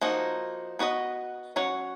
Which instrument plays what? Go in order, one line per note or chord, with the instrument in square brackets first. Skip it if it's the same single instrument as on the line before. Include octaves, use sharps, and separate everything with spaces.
[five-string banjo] F3 A#3 D#4 F#4
B3 F#4 B4 D#5
F#3 C#4 F#4 C#5